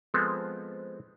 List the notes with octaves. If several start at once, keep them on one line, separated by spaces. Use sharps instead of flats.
F3 G#3 B3 C4 A4